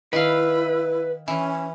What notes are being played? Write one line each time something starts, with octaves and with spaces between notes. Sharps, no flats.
D#3 E4 B4 F5
E3 C#4